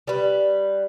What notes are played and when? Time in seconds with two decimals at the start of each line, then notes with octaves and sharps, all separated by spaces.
0.07 G3 B4